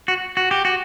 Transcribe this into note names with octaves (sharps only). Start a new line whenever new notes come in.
F#4
F#4
G4
F#4